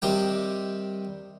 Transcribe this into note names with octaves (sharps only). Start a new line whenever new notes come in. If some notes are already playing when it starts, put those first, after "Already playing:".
C3 D#3 G3 G5